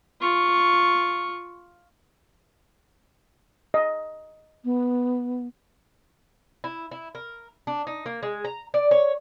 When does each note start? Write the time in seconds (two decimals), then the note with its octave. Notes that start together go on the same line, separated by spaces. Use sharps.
0.21 F4 C#6
3.74 D#5
4.65 B3
6.64 E4
6.91 E4
7.15 A#4
7.67 D4
7.87 D#4
8.06 A#3
8.23 G#3
8.45 A#5
8.74 D5
8.91 C#5